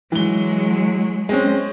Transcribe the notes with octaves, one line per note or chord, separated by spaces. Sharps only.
E3 F#3 G#3 G7
G#3 C4 C#4